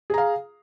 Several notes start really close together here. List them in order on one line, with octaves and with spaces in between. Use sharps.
G#4 A#5 F5